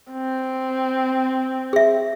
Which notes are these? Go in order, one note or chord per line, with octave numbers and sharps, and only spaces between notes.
C4
G#4 E5